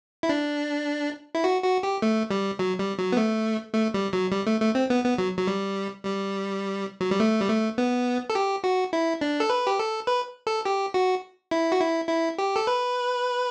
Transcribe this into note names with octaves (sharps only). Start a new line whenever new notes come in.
E4
D4
E4
F#4
F#4
G4
A3
G3
F#3
G3
F#3
B3
A3
A3
G3
F#3
G3
A3
A3
C4
B3
B3
F#3
F#3
G3
G3
F#3
G3
A3
G3
A3
B3
A4
G4
F#4
E4
D4
A4
B4
G4
A4
B4
A4
G4
F#4
E4
F#4
E4
E4
G4
A4
B4